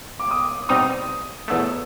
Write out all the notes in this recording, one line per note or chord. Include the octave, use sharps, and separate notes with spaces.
D6
D#6
B2 G3 C4 D#4 D#6
E2 B2 F#3 A3 E6